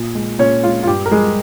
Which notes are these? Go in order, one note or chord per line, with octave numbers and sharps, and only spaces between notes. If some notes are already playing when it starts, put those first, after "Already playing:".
Already playing: A#2
G#3
A#2 C#4 C#5
G#3 F4
F4
G2 G4
A#4
G3 G#3 G#4